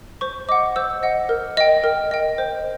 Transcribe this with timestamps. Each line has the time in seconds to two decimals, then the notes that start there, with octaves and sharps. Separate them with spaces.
0.21 C5 C#6
0.49 D#5 F#5 D6
0.76 C5 E6
1.03 D#5 F#5
1.29 A#4
1.57 D#5 G5
1.84 A#4
2.11 D#5 G5
2.38 C5